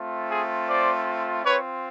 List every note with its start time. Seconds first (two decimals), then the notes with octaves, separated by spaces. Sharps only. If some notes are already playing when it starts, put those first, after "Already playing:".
Already playing: A3 C4 F4
0.30 G#4
0.68 C5 D5
1.45 C4 F4 B4 C#5